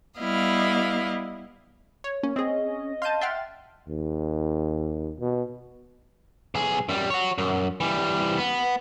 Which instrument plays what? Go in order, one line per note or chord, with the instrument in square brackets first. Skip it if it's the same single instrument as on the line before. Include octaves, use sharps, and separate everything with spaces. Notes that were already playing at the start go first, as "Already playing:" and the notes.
[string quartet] G3 B3 E4 D#5 F5
[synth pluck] C#5
[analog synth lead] A#3 [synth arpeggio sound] C#4
[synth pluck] C4 G#4 [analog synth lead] D#5
[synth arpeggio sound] F5 A5 [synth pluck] C6 G6 D#7
[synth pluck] E5 F6 [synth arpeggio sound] F#5 G5 C6 [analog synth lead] A6
[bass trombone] D#2
B2
[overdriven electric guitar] B1 G#4
F#2 G3
F#4 C#5
F#2
E3 G3
B3